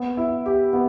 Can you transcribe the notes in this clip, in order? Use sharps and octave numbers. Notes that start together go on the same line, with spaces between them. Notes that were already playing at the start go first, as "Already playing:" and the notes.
Already playing: B3
E4
G4
B3